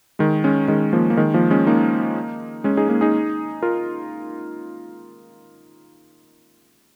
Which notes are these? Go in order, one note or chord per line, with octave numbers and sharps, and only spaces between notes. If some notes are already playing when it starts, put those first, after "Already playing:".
D#3 G#3
G#3 C#4
D#3 G#3
F3 A#3
A#3
D#3 G#3
F3 A#3
G#3 C#4
A#3 D#4
G#3 C#4
D#4 G#4
A#3 D#4
D#4 G#4
F4 A#4